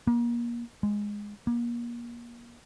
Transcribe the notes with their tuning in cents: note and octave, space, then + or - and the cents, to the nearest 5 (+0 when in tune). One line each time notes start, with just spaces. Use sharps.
A#3 +30
G#3 -5
A#3 +30